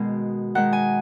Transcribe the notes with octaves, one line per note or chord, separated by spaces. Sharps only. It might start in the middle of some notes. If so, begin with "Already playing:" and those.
Already playing: B2 D#3 G#3
D#3 G#3 F#5
G#5